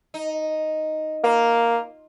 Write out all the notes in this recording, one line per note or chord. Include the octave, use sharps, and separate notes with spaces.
D#4
A#3 F4